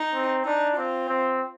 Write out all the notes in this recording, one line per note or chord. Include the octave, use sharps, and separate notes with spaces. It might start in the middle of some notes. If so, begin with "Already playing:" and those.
Already playing: D#4
C4
D4 D#4
C4 F4
C4